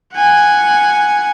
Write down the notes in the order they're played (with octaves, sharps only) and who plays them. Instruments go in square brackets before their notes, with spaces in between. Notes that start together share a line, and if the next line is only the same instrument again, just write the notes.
[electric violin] F#5 G#5